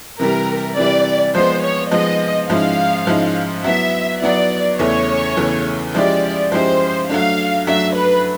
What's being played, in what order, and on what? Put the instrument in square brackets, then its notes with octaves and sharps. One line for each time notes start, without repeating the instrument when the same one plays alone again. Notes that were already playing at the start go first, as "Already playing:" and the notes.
[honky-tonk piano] C3 E3 G3 [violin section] A#4
[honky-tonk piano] C3 E3 G3 [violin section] D5
[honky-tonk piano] F3 G#3 B3 [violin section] C5
[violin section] C#5
[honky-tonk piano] F3 G#3 B3 [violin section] D#5
[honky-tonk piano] G#2 F3 G#3 C#4 E4 [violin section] F5
[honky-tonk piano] G#2 F3 G#3 C#4 E4
[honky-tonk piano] F#3 B3 E4 [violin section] E5
[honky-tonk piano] F#3 B3 E4 [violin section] D5
[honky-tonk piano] E2 C#3 E3 A3 C#4 [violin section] C#5
[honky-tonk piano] E2 C#3 E3 A3 C#4
[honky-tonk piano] F3 G#3 C#4 E4 G4 [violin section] D5
[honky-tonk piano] F3 G#3 C#4 E4 G4 [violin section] C5
[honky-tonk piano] F#3 A3 D4 [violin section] F5
[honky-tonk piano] F#3 A3 D4 [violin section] E5
[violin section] B4